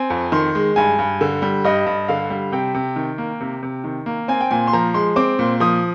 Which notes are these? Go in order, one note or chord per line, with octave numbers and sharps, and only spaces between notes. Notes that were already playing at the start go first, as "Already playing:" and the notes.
Already playing: C4 G#5
F2
D#3 C6
G#3
G2 G#5
G2
D3
G3
G2 D#5
G2
D3 F5
G3
C3 G5
C3
D#3
A#3
C3
C3
D#3
A#3
C4 G#5
G5
A#2 G#5
C6
F3 A#5
G#3 C6
C4 D6
A#2
F3 D#6